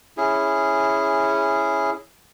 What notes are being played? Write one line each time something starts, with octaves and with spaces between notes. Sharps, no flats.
C#4 E4 G#4